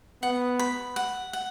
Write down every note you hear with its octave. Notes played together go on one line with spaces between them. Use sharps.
B3 F#5
B5
F#5
F#5